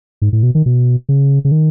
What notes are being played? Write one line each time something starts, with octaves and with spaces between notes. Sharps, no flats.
G#2
A2
B2
D#3
B2
C#3
C#3
D#3